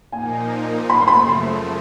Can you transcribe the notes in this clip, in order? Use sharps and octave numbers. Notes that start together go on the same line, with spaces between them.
A#2 F3 A#3 D#4 G#5
F#2 C#3 F3 A3 B5
C6
B5
C6